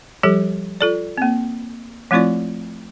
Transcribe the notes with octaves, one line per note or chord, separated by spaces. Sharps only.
F3 G3 G4 A4
F4 A4 D5
A#3 C4
F3 A3 C4 E4 F4 D5